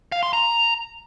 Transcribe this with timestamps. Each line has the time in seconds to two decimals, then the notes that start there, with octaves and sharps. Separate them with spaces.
0.12 F5
0.23 C6
0.33 A#5